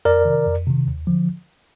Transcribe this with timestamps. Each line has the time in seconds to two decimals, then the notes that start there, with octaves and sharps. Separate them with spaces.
0.05 F2 A#4 D5
0.25 C3 D#3
0.46 F2
0.67 C3 D#3
0.87 D#2
1.07 D3 F3